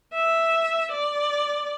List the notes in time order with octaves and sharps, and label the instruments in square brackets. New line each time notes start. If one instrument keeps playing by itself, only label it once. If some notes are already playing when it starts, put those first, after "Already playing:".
[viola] E5
D5